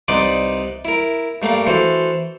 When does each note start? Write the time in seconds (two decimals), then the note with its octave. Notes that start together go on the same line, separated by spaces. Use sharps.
0.08 C2 D#4 B4 D5 C6 D6
0.85 E4 A#4
1.42 G2 A3 A#3 F5
1.66 E3 F#4 A4 C5